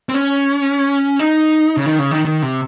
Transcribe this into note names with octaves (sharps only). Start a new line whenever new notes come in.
C4
C#4
D#4
C#3
D#3
C#3
D#3
D#3
C3